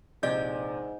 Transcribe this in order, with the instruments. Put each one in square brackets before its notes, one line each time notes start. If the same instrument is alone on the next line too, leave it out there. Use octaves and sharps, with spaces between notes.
[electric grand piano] A#1 C3 [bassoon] G#2 [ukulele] G#4 D5 [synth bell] D#5 G6